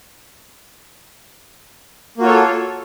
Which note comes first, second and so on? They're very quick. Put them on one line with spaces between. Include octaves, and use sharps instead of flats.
A#3 F#4 F4 C#5 A4